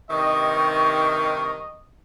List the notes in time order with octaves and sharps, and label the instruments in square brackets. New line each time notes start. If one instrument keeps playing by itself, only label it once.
[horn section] G2 C3 D#3 [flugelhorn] D#5 [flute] C#6